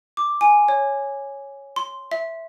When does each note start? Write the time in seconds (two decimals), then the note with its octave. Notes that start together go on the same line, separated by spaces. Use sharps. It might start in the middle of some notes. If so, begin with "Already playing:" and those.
0.17 D6
0.41 G#5
0.69 C#5
1.76 C6
2.12 E5